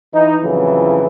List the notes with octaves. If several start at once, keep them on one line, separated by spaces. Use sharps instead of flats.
E3 D#4
F2 A2 C#3 E3 F#3